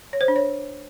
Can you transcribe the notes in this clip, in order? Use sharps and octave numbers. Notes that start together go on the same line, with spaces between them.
C#5
C5
D4
C#5